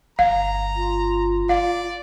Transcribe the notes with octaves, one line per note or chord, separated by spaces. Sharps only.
G1 F5 A#5
F4
D5 F5